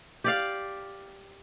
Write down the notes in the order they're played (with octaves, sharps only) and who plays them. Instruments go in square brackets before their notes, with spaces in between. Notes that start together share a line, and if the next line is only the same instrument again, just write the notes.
[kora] G4 D5 F5